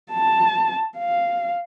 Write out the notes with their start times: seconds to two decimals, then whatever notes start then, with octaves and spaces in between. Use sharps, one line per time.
0.12 A5
0.98 F5